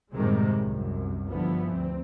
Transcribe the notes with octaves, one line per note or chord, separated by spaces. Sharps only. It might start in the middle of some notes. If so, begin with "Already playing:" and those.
F#2 A2 C3 D#3 G3 G#3
C2 F#2
G1 D3 E3 F3 G3 B3
D2 C4